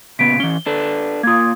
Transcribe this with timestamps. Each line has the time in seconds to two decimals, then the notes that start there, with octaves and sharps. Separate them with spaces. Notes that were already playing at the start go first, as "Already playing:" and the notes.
0.19 A#2 C#3 B3 B6 D7
0.40 E3 C#4 G7
0.66 D4 A4 B4
1.23 A#3 F4 D#6 G#6